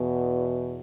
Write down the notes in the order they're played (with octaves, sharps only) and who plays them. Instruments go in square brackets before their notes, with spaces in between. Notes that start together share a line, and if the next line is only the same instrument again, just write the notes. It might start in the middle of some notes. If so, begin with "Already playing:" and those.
Already playing: [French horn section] E2 B2